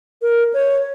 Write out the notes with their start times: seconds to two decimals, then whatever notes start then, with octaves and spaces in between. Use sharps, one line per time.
0.22 A#4
0.54 C#5